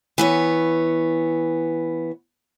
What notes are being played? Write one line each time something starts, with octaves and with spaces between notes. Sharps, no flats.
E3 B3 C#5